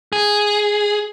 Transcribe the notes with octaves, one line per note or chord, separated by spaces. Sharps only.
G#4